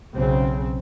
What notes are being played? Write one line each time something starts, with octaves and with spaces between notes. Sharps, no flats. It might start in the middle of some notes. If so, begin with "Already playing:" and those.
B1 C#3 C4